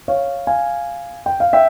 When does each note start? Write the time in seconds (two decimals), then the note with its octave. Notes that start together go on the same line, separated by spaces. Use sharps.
0.08 C#5 F5
0.47 F5 G#5
1.26 G5
1.40 F5
1.53 E5 G5